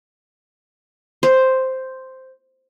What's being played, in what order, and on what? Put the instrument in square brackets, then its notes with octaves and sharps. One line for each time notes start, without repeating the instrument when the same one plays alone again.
[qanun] C5